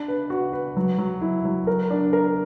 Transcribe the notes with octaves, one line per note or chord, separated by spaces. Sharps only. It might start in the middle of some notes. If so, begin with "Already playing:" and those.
Already playing: D4
B4
F#4
B4
F#3
F#3
E4
F#3
A#4
D4
A#4